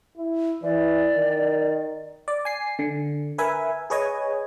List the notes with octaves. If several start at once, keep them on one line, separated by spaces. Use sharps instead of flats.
E4
E3 D5
D#3
D5
G#5 C7
D3
A#4 B4 E5 G#5
G#4 B4 C#5 D#5 G#5